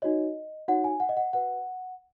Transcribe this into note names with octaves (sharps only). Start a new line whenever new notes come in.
D#4 F#4 C#5 D#5
D#4 F#4 C#5 F#5
G#5
F#5
D#5
F#5
F#4 B4 F#5